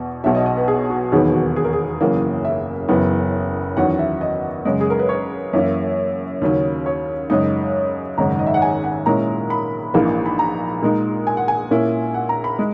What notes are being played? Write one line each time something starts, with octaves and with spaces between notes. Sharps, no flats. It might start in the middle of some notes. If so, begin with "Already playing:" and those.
Already playing: E2 B2
B1 B2 F#3 E5
D#5
D#5
B4
G#4
F#4
E1 D#2 D#3 F#3 B3 G#4
F#4
G#4
A#4
G#4
F#1 F#2 E3 A#3
E5
F#1 F#2 E3 B3
E2 D#3 F#3 C#4 F#5
E5
D#5
F#2 C#3 G#3
G#4
A#4
B4
C#5
F#2 E3 A#3 E4
D#2 C#3 F#3 C#4
C#5
F#2 C#3 G#3 D#4 D#5
G#1 F#2 C#3 G#3 A#5
D#5
E5
F#5
G#5
F#5
A#2 G#3 C#4 E4 A#5
B5
A#1 G#2 E3 A#3 D#4
B5
A#5
A#2 G#3 D#4
G#5
F#5
G#5
A#2 A#3 C#4 E4
F#5
A#5
B5
G#3